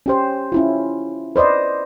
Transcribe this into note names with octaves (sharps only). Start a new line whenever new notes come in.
C#4 G4 C5
C#4 E4 F4
B4 C5 D5 D#5